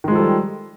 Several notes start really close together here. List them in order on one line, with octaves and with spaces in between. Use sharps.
D#3 G#3 F3 A4 G3